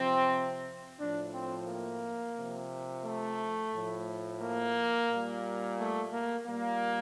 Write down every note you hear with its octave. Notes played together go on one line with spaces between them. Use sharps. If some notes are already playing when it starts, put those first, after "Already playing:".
Already playing: C3 F3 C4
A2 F3 D4
C4
A#3
C3 F3
A3
A2 F3
A#3
A#2 G3
A3
A#3
A#2 G3 A#3